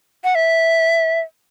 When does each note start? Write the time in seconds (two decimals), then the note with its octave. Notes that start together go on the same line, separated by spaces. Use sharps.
0.24 F#5
0.35 E5